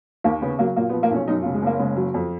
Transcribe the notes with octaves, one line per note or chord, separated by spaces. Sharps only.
D#2 A#3
C#3 B3
F#3 A#3
A#2 A#3
B3
F3
A#3
B1 C#4
F#2 D#4
F4
C#3
G#3
F#1 A#3
C#3 G#3
F#3
F2